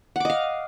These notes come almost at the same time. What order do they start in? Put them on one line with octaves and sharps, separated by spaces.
F#5 D6 D#5 F5